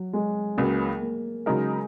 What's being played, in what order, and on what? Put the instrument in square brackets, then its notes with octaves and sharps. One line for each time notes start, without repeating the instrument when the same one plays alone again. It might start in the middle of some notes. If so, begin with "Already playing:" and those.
Already playing: [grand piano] F#3
G#3
[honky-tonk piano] C#2 C#3 F#3 [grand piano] A#3
[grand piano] A#3
[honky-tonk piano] C#3 F#3 D#4 A#4 [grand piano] G#3